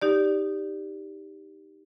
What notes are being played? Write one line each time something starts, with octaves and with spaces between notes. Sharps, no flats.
D#4 G4 D5